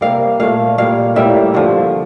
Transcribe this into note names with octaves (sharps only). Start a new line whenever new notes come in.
C3 G3 A#3 F5
A#2 A3 F5
A#2 G3 A#3 F5
A2 G3 A#3 E5
G2 D3 F3